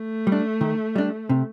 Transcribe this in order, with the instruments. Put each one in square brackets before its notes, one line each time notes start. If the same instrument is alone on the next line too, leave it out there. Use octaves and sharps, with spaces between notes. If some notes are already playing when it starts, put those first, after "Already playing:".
Already playing: [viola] A3
[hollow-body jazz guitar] G3
D4
D#3
G3 D4
C3